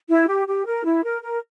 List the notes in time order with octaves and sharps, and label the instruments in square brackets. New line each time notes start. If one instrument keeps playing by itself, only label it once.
[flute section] E4
G4
G4
A#4
E4
A#4
A#4